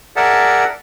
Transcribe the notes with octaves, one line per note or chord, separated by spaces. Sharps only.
G#4 A#4 D5 E5 F#5 A5